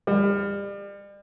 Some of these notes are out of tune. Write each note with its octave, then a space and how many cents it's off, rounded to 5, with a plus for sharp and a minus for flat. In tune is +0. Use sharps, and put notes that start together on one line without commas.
G3 +35